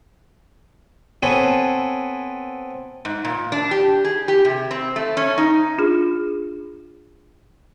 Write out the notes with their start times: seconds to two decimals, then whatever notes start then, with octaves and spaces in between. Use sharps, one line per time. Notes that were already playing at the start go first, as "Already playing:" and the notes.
1.23 B3 C4 A4 B4 C#5 G#5
3.05 G#2
3.25 A#2
3.52 D4
3.71 G4
4.05 G#4
4.28 G4
4.45 C3
4.71 C4
4.96 A3
5.17 C#4
5.38 D#4
5.78 D4 F4 G#4